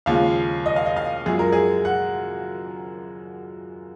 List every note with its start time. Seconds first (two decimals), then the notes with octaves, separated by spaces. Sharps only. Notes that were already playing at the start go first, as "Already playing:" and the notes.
0.06 D#2 C#3 F3 G#3 F5
0.66 D#5
0.76 F5
0.86 D#5
0.96 F5
1.26 F#2 F3 G#3 G#4
1.39 A#4
1.52 G#4
1.85 F#5